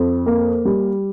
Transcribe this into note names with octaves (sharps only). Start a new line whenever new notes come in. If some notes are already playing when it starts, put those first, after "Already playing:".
Already playing: F2
A#3
G3